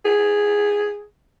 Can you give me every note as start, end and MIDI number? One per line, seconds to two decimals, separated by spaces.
0.05 1.04 68